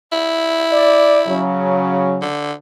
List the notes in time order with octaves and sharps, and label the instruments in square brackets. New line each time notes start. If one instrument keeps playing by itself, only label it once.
[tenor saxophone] E4
[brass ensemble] D5
C#3 F#3
[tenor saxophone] D3